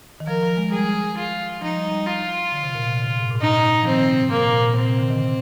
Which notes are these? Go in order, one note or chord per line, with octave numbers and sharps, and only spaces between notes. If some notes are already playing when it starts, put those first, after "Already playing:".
D#3
F3 A#4
F3
G#3
G3 G#4
F4
F3 D#4
G3
G3
F4
D3
C3
A#2
C3
D3
A#2
G#2
A#2
G#2
A#2 D#4
F3
D#3 C4
D#3
C3
G#2
A#3
A#2
A#2
A#2
A#2 C4
C3
D3
D#3